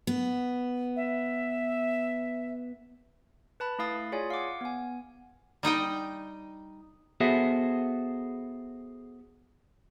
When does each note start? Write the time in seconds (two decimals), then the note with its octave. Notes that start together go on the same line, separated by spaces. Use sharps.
0.07 B3
0.96 E5
3.60 B4 A5 B5
3.79 A3 E4 F5 D#6 A6
4.12 F4 G#4 C#5 D5 G#5
4.30 F5 F#5 D6
4.61 B3 G#5
5.63 G3 D#4 D#5 G5
7.20 B3 F#4 G#4 A4 C5 E5